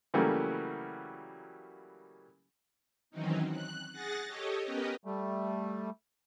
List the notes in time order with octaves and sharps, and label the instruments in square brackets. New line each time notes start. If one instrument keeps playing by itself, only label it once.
[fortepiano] C#3 E3 F#3 G3 A3 A#3
[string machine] D#3 E3 F#3 C4 C#4 D#4
F#6
G#4 F#5 F#6 A6 A#6
G4 A4 C#5 D#5
B3 C#4 G4 A#4 B4 D#5
[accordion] G3 A3